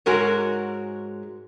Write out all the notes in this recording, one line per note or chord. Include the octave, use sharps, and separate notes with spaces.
G#2 G#3 F#4 A#4 C#5